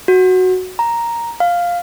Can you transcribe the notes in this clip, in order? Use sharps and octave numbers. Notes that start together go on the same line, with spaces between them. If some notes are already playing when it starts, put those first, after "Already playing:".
F#4
A#5
F5